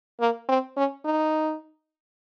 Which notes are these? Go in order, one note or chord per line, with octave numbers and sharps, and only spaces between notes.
A#3
C4
C#4
D#4